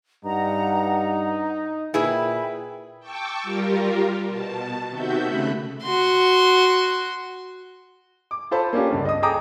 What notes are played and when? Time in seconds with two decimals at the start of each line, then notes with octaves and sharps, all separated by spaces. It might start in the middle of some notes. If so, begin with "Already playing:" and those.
0.25 G2 D#4 F#5 A#5
1.94 A#2 E4 G#4 B4 G5 B5
2.99 G5 A5 C#6 D6 E6
3.43 G3 F4 G4 A#4
4.27 B2 A5
4.89 C3 D#3 F#4 E5 G6
5.23 C#3 A3 B5 F#6
5.83 F#4 C6
8.31 D6
8.51 F4 A4 C5 A5 B5
8.73 A#3 C#4 D4 F4 G4
8.90 C#2 G2
9.05 D#5 D#6
9.22 G#4 A4 G5 A#5 D6 D#6